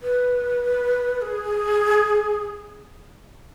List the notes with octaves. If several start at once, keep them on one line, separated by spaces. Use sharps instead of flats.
B4
G#4